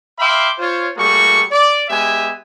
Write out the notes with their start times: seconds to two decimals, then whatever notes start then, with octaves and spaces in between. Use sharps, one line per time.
0.19 E5 F5 G5 B5 C6 D6
0.58 F4 C5 C#5
0.97 G3 A3 A#3 F#4 G#4 C#6
1.51 D5
1.89 G#3 B3 G4 E5 G#5